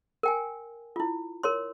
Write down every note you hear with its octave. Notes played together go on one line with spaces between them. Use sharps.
A#4 G5 G#5
E4 F4
A#4 C#5 C6